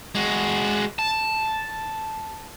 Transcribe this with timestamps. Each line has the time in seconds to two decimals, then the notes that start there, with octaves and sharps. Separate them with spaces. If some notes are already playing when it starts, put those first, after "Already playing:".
0.15 G#3 F#4
0.99 A5